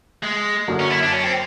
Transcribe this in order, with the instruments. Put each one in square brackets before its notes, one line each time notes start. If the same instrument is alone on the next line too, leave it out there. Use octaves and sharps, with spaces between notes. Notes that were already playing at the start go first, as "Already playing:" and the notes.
[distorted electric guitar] G#3
[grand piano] F#2 D3 F#3 A#3
[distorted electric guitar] C#4
E4
D4
C#4
C4